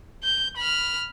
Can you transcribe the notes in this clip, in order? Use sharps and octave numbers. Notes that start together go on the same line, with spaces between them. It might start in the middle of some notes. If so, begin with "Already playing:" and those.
G6
B5 F6